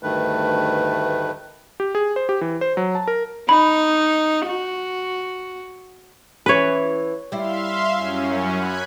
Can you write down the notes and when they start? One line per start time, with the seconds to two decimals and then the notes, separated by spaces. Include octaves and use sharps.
0.03 D2 G2 D#3 A3 B4
1.80 G4
1.95 G#4
2.16 C5
2.29 G4
2.41 E3
2.61 C5
2.77 F#3
2.95 A5
3.08 A#4
3.49 D#4 B5
4.47 F#4
6.46 E3 C#4 B4 C#5
7.32 G3 E4 E5 F5 C6
7.94 F#2 C#4
8.54 B5 F#6 G#6